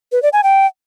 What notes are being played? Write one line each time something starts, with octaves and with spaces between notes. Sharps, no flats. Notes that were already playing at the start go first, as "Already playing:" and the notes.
B4
D5
G#5
G5